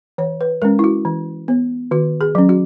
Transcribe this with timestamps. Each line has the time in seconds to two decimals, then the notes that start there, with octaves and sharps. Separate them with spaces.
0.18 E3 C#5
0.41 B4
0.62 G#3 C#4 A#4
0.79 E4
0.84 F#4
1.05 E3
1.48 B3
1.91 D#3 F#4
2.21 G#4
2.35 F#3 C#4
2.49 F#4